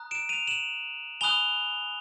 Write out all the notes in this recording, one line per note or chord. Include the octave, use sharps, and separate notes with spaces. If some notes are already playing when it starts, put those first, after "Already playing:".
Already playing: A#5 D#6 F#6
D7 E7
D#7 F7
E7 F#7
G#5 B5 D#6 F#6 F7 G7